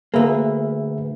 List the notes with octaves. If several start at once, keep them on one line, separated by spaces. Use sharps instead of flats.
D2 A#3 G#4 B4 E5